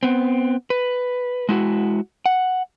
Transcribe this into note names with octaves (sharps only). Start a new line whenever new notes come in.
B3 C4
B4
G#3 E4 F#4
F#5